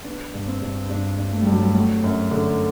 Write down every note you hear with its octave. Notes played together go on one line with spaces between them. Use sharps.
B3 D4
G2
C4
G2
G2 D4
G2
A3
G3
G2
F#3
G3
F#3 A3
F#2
D3